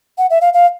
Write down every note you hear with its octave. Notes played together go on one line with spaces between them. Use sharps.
F#5
E5
F5
F5